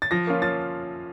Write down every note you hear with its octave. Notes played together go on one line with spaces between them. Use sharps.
A6
F3 A#6
A#3 C#4 F4
F3 A6